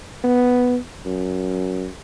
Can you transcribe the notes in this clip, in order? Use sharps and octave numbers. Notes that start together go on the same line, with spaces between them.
B3
F#2